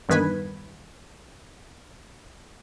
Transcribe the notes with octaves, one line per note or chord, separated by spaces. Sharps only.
E2 G2 D#3 B4 G#5 B5